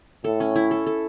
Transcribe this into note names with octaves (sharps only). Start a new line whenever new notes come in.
A2 A4
C#4
E4
A4
A4